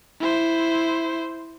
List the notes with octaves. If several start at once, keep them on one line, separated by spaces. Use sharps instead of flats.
E4 C5